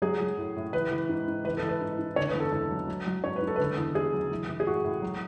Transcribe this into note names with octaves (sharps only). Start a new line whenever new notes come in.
F#3 G#4
F#3
A2
A2
E3 B4
E3
G#2
G#2
E3 B4
A4
E3
B4
G#2
G#2
D3 C#5
B4
E2
A4
E2 A4
F#3
F#3
F#3
G#2 C#5
B4
G#2
A4
D3 B4
A4
E2
E2 G#4
F#3
E3
E3
G#4
A2 F#4
A2
F#3